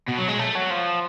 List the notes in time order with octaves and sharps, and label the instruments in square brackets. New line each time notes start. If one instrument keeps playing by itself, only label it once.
[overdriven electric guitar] B2
F#3
G#3
A3
F#3
F3